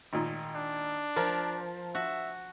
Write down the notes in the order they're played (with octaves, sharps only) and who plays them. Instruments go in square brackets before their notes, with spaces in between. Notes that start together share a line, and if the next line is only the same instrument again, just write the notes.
[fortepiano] G#1 A#2
[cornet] D4
[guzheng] F3 [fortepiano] A#4
[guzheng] F#4 [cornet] E5